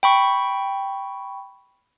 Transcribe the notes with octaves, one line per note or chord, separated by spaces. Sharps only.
G5 B5 C#6